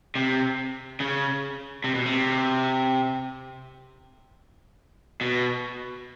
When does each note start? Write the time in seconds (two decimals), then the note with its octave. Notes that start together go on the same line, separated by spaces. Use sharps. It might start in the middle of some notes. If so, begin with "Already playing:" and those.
0.15 C3
1.00 C#3
1.84 C3
1.95 B2
2.06 C3
5.21 B2